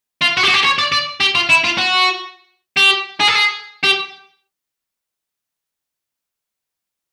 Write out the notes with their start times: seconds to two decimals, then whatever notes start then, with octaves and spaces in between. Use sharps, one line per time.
0.22 F4
0.37 F#4
0.43 G4
0.48 F#4
0.54 G4
0.64 C#5
0.79 D5
0.92 D5
1.21 G4
1.35 F4
1.49 E4
1.64 F4
1.78 F#4
2.77 G4
3.20 G#4
3.28 A4
3.35 G#4
3.83 G4